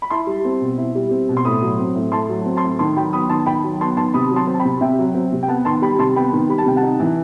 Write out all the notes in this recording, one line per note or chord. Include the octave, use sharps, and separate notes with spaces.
B5
E4 A5 C6
G3
C4
B2
E4
G3
C4
B2
C6
A2 B5 D#6
F#3
C4
A2
A2 A5 C6
F#3
C4
A5 C6
A2
D#3 A5 C6
F#3 G5 B5
B3 B5 D#6
D#3 A5 C6
A5
D#3 G5 B5
F#3
B3 A5 C6
D#3 A5 C6
C3 B5 D#6
F#3
A5 C6
C4
A5
G5 B5
C3
C3 E5 G5
F#3
C4
C3
G5
B3 F#5 A5
D#3 A5 C6
G3 G5 B5
C3 A5 C6
B3 G5 B5
D#3
G3 B5
A5
C3 G5
F#5 A5
D#4
E3